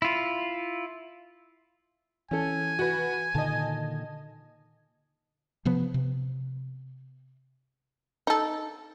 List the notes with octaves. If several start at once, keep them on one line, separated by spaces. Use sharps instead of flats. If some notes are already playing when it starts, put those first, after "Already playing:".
E4 F4
E3 C#4 A4 G#5
F#4 B4
A#2 D3 D#3 D#5 A5
C3 F3 B3
C3
D#4 A4